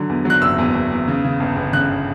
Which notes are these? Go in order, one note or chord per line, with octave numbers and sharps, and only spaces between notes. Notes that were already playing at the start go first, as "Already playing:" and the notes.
Already playing: D3 F#3
E2
F#3 F#6
F#1 E6
E2
E2
E2
C#3
C#3
G1
G1
C#3 F#6